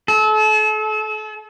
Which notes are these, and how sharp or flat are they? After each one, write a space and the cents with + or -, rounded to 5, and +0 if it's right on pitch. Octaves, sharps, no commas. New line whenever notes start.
A4 -35